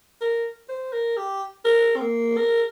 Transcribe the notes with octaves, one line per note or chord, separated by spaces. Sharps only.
A#4
C5
A#4
G4
A#4
C4
A#3
A#4